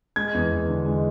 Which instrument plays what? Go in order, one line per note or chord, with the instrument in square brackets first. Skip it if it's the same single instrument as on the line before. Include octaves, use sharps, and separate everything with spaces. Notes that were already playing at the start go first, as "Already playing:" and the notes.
[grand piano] G#3 G#6
E2
E2
D3
G#3